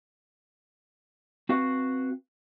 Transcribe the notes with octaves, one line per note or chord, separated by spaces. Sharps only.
C4 F#4 B4 F5